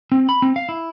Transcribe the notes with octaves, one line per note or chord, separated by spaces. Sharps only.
C4
B5
C4
F5
E4